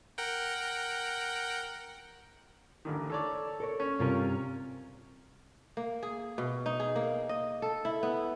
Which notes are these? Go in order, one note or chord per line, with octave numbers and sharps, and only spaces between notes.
A#4 F#5 G5
A1 D3 D#3
A4 C#5 D5
A4 A#4 C#5
C#4
G2 C3 C#4 F4 A#4 C#5
A#3
G#4
B2
D#4
G#4
A#3
D#5
A4
E4
B3